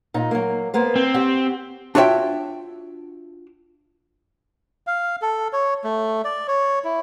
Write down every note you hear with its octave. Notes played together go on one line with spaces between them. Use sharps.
A#2 D#4
F#3 A#3
A#3 B3 C5
C4
F#4 G4
D4 F4 F#4 C#5 E5 G5
F5
A4
C#5
A3
D5
C#5
E4